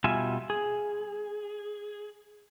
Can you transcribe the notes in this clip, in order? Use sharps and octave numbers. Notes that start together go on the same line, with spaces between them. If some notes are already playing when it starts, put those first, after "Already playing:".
B2 G3 F4 E5 G#5
G#4